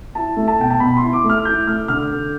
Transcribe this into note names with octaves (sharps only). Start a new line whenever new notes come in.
E4 A5
A3
A5
B2 G5
A5
B2 B5
E4 C6
D6
A3
F6
E4 G6
A3 F6
D3 F6
D3